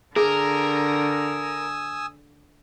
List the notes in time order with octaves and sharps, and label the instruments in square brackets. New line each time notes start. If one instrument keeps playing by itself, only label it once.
[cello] D3 [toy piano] G#4 [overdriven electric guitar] A#4 [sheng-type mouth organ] G#5 D#6 E6